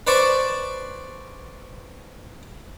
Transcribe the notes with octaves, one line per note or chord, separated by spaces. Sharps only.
B4 C5 D5 A5 C#6